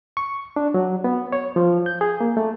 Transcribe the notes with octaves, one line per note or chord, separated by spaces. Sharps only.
C#6
D4
F#3
B3
C#5
F3
G6
G#4
A#3
A3